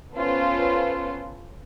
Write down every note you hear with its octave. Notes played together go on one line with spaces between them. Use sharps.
B3 C#4 F4 A4 B4 C5